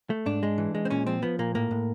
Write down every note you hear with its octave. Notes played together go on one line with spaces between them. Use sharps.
A3
G#2 D4
G#3
E3
G#3
C4
A#2 C#4
F3 C4
F3 B3
A#2 A#3
A2 A#3
A2